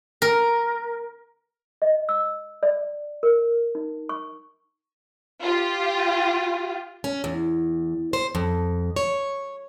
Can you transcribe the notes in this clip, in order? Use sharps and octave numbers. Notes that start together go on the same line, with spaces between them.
A#4
D#5
E6
D5
A#4
D#4
C#6
F4 G4
C#4
E2
C5
F2
C#5